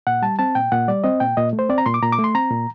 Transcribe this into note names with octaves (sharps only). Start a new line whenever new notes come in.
A#2 F#5
G3 A5
C4 A5
A#2 G5
A#2 F#5
G3 D5
C4 D#5
A#2 G5
A#2 D#5
A3
C5
C4 D5
A#5
A#2 C6
D6
A#2 A#5
D6
A3
C6
C4 A#5
A#2